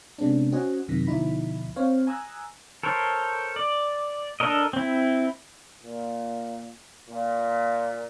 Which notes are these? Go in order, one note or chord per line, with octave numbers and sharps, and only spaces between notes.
C3 G#3 B3 C#4 D4
C#4 F#4 C5 D#5 F#5 G#5
F#2 C3 D#3 A#6 B6
D2 B2 F3 D#4 E4 B5
C4 C5 C#5 F5
G#5 A#5 D#6 E6 F#6 G#6
A4 A#4 C5 C#5
D5
D4 A4 A#4 D#5
C4 E4
A#2
A#2